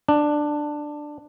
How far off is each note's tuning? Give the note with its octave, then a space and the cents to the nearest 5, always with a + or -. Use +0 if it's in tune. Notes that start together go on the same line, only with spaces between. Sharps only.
D4 +10